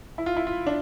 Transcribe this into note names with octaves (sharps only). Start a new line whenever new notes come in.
E4
F4
E4
F4
D4